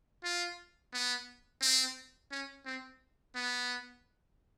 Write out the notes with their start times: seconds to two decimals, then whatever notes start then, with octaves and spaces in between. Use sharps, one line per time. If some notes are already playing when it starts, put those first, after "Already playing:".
0.24 F4
0.93 B3
1.62 C4
2.32 C#4
2.66 C4
3.36 B3